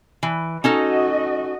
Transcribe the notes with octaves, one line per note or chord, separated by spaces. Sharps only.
E3
C#4 D#4 F#4 A4 D#5